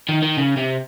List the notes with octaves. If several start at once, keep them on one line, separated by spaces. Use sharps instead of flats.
D#3
D#3
C#3
C3